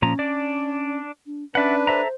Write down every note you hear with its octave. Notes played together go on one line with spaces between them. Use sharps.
A#2 F3 C#4 A#5
D4 D5
D4
C#4 D4 B4 D5 E5 F#5
A4 C5 E5 A#5